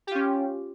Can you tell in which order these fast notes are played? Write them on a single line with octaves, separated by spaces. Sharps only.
G4 F4 C#4